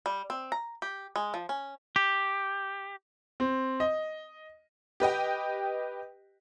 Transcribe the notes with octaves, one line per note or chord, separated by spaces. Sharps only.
G3
C4
A#5
G4
G#3
F3
C#4
G4
C4
D#5
G4 B4 D#5 G5